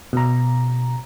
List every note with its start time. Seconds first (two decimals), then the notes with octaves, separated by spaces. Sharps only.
0.13 B2 A#5